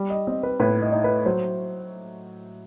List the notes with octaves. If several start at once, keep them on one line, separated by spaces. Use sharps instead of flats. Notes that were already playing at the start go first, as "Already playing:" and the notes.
Already playing: G3
D#5
C4 D#5
B4
A2 B4
D#5
D#4
B4
F#3 C5